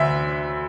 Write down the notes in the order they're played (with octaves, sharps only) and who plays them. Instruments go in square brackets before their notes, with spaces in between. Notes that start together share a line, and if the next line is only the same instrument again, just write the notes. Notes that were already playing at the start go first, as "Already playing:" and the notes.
Already playing: [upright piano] D2 D3 E5